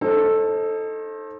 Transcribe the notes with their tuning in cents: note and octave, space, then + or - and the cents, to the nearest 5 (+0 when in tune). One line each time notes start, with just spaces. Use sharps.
D#4 +0 A4 +0 C5 +40